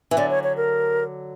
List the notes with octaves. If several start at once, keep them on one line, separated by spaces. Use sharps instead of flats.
E3
D3 F#3 D5
C#5
C#5
A#4